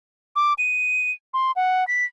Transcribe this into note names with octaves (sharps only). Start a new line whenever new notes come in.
D6
D#7
C6
F#5
B6